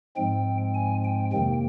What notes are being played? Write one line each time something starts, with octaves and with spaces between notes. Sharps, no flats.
G#2 F3 G#3 C4 G5
G#5
G5
F2 C3 D#3 A#3 G5